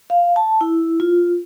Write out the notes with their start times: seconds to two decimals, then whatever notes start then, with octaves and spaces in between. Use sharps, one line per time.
0.10 F5
0.36 A5
0.61 E4
1.00 F4